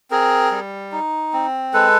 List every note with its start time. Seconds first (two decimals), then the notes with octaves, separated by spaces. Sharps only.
0.11 C4 G#4 A#4
0.51 G3
0.92 D#4
1.33 C4
1.73 G#3 A4 B4